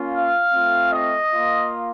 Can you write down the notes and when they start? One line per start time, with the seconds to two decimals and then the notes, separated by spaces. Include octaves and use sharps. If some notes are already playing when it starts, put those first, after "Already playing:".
Already playing: A#3 C#4 F4
0.11 F5
0.52 A3 C4 F4
0.93 D#5
1.33 A#3 F4